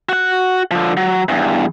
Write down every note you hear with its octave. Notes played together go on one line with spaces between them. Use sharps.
F#4 F#5
D3 F3
F#3
E2 G2